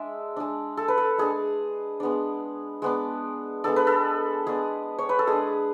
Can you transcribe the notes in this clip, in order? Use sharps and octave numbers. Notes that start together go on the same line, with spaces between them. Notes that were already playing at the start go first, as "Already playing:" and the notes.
Already playing: G#3 D4 E5
G#3 D4
A4
B4
A4
G#3 D4 G#4
G#3 B3 D4
G#3 B3 D4
G#3 B3 D4 A4
B4
A4
G#3 B3 D4 G#4
C#5
B4
A4
G#3 D4 G#4